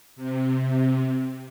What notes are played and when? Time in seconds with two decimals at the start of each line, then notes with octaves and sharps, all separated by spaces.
0.16 C3